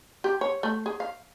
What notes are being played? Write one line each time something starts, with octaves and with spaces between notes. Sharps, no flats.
G4
C#5
A3
G#4
F5